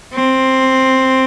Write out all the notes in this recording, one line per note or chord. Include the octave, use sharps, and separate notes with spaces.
C4